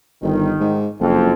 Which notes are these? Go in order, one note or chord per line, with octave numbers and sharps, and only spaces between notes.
G1 D#3
G#2
F#1 F2